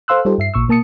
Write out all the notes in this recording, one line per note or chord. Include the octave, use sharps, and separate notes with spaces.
A4 C5 F5 C6 E6 F#6
G3 D#4 F4 G4 A4 C5
G2 E5 C7
A1 A#2 C#6 E6
B2 A#3 A5 D#6 C#7